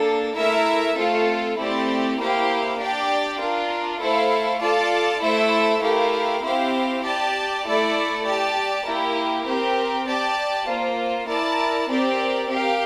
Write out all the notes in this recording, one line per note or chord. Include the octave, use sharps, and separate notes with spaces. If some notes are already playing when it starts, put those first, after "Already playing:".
Already playing: A#3 D4 A4
A3 E4 A#4 E5
A3 C4 F4 A4
A3 C4 E4 G4 D5
A#3 E4 G4 C5 F5
D4 G4 D5 G5
D4 F4 A#4
A3 E4 A4 C5 F5
F4 A4 D5 A5
A3 E4 A4 C5 E5
A3 E4 G4 A#4 F5
C4 E4 G4 C5 F5
G4 D5 A5
A3 E4 A4 D5
G4 D5 A5
A#3 E4 G4 A#4
C4 G4 A#4
G4 D5 A5
A#3 F4 C5
E4 A#4 D5 A5
C4 G4 A#4 D5
G4 A#4 F5